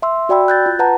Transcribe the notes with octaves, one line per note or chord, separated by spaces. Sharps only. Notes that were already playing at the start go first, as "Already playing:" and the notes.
E5 C6 E6
F#4 D5 G5 B5 E6
F#6 G6 A6
F4
B4 F#5 A5 A#5